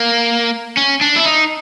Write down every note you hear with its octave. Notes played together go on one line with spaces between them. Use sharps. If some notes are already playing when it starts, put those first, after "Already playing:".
Already playing: A#3
C#4
D4
E4
D#4